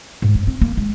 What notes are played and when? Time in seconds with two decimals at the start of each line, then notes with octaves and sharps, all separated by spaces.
0.22 G#2
0.35 G2
0.47 C4
0.61 A#3
0.77 G#3